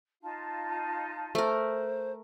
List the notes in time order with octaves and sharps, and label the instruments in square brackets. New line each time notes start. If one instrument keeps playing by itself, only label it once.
[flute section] D#4 F4 A5
[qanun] A3 A#4 [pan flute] C5